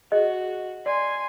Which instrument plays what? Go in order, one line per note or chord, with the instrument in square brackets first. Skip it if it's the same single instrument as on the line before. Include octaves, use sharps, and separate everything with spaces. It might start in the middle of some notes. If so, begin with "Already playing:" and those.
[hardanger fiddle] F#4 [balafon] G#4 [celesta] D#5
[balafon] D5 [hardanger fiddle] G#5 C6